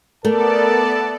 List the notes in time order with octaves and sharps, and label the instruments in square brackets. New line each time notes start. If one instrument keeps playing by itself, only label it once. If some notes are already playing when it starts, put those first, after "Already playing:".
[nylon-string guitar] A3 [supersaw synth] B3 A4 D5 [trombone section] A#4 [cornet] A5